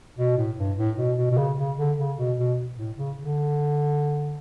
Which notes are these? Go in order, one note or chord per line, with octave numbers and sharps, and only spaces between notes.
B2
A2
G2
A2
B2
B2
B2
C#3
C#3
D3
C#3
B2
B2
A2
C#3
D3